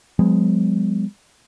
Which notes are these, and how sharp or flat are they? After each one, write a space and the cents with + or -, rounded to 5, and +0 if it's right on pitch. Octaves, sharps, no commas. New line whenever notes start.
F3 +40 G#3 -30 B3 +25